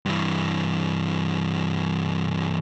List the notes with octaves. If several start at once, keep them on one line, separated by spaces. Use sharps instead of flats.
G2 E3